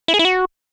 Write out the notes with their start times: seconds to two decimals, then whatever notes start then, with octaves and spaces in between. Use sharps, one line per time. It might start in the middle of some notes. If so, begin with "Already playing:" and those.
0.08 E4
0.14 G#4
0.19 E4
0.25 F#4